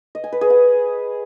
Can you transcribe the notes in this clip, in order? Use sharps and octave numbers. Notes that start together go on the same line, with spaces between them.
D#5
G#5
B4
G#4
F#5